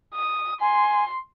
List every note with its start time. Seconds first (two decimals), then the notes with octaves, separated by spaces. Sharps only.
0.14 D#6
0.61 G#5 C6